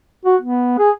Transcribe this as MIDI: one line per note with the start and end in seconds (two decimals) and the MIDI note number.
0.25 0.36 66
0.42 0.77 59
0.78 0.90 68